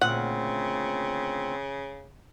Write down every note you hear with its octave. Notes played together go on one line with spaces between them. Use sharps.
D2 A#2 C#3 C4 F#5